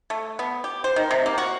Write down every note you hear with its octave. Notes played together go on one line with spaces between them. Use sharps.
A3
B3
G4
C5
D#3
C3
A#3
F#4